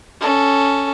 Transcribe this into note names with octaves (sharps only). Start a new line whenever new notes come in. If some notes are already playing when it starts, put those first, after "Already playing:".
C#4 A4